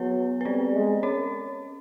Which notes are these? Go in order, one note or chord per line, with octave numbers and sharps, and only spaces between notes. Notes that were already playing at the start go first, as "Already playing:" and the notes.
Already playing: F#3 B3 B4
B4
G3 C4 C5
G#3
C#4 C#5